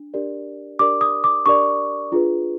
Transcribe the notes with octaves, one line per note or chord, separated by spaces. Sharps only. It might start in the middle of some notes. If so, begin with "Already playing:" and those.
Already playing: D4
D4 G4 A#4 D5
D4 G4 A#4 D5 D6
D#6
D6
D4 G4 A#4 D5 C#6
D4 F4 G#4 B4